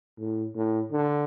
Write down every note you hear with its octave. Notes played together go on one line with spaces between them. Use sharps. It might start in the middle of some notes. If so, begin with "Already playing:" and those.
A2
A2
D3